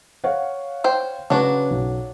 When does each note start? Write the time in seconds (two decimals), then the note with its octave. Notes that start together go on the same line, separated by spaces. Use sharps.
0.24 C#5 F5 F#5
0.84 C5 G5
1.30 C#3 F#3 D4 F#4 B4
1.70 B1